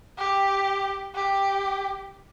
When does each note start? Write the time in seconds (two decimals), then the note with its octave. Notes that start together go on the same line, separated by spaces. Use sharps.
0.18 G4
1.15 G4